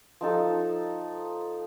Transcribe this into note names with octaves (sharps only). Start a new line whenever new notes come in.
F3 D#4 A4